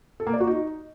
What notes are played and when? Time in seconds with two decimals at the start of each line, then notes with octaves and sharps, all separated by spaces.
0.20 A4
0.27 A#3
0.33 D5
0.40 F#4
0.47 D#4